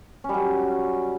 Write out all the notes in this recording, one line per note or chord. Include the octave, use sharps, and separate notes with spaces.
F#3 G3 C#4